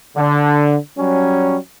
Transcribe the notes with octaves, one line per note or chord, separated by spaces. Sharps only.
D3
F#3 G3 C#4